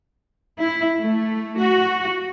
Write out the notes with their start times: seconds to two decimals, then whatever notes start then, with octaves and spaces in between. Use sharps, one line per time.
0.58 E4
0.98 A3
1.58 F#4